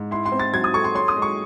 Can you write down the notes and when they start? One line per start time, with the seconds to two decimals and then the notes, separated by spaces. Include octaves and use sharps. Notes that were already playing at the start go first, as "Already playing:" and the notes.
Already playing: G#2
0.11 E4 C6
0.26 C6
0.32 C4
0.40 A6
0.53 F#3 G#6
0.64 D#6
0.74 A4 C#6
0.84 C6
0.94 C#5 C6
1.08 D#6
1.16 G#3
1.22 C#6